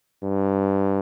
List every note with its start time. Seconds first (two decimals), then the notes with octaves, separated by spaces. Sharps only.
0.23 G2